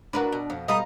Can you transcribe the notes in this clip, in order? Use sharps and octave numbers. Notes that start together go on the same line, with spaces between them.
A2 D4 F#4 A#4 B4
B2
F2
B2 G3 A4 B4 D#5 F5 A#5 D#6